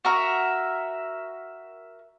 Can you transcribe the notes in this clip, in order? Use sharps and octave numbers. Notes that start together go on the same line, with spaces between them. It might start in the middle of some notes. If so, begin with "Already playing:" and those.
F#4 A#4 E5